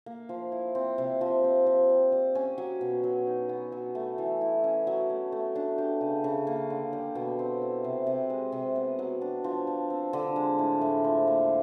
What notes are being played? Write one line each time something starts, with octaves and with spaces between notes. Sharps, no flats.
A#3
F3
E4
C4
C3
F3
C4
F3
G3
G3
C#4
F#3
B2
F#3
D#4
B3
F#3
A3
E3
E4
C#4
F#3
A3
A3
D4
G4
C#3
C#3
A#3
D3
G3
B2
C4
E4
C3
C3
G#3
C3
B3
F#3
D4
F3
G3
C4
D3
G#3
A2
A2
F3
A#3